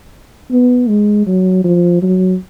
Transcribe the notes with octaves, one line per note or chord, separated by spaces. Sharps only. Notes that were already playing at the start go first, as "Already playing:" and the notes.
B3
G#3
F#3
F3
F#3